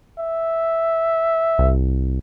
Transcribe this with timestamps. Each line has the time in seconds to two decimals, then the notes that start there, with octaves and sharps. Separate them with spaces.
0.19 E5
1.59 C2